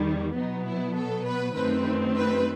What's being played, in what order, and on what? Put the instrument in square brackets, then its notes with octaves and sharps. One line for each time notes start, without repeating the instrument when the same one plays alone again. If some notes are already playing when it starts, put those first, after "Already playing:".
Already playing: [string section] E2 D#3 G3
B2 F#3 B3 D#4
E4
A4
B4
F#2 D#3 A3 C4 B4
B4